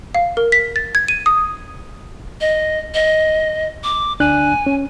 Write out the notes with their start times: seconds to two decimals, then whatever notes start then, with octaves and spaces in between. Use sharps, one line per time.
0.15 F5
0.37 A#4
0.52 B6
0.76 A6
0.95 G#6
1.08 D#7
1.26 D#6
2.41 D#5
2.94 D#5
3.84 D6
4.20 D2 D4 G#5 F#6
4.66 C#4